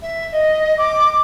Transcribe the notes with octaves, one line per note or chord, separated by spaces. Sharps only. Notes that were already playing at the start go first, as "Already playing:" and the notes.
E5
D#5
D6